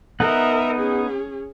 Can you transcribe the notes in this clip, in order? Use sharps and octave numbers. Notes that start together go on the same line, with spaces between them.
B3 D#4 A#4 E5 F#5
C#4 G#4